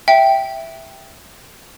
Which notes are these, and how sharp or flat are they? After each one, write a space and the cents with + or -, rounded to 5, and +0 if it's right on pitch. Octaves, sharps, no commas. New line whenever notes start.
E5 +0 G5 +0